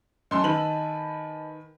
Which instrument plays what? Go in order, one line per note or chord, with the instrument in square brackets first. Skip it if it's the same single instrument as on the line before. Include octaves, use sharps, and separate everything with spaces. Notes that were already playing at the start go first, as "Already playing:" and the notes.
[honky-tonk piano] F#2 C6 E6 [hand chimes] D#5 G#5 A5
[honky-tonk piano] D#3 B4 F#7